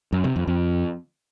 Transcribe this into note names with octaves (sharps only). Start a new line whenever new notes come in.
F#2
C3
F2
F2